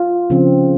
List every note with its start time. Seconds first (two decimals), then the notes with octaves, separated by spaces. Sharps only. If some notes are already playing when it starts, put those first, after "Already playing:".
Already playing: F4
0.30 C#3 F3 C4